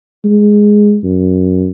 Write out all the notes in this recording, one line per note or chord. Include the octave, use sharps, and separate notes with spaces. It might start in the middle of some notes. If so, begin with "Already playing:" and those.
G#3
F#2